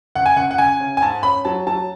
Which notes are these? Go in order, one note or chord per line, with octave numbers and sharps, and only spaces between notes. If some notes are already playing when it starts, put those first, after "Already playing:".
C#2 F#5
G#5
C#2 F#5
F#5
C#2 G#5
C#3
G#5
G#2 A5
C#4 B5
F#3 A5
F#3 A5